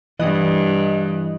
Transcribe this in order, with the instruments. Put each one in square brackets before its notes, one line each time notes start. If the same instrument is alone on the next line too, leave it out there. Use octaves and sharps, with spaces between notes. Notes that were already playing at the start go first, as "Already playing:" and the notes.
[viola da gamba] G2 [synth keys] E3 D#5 F#6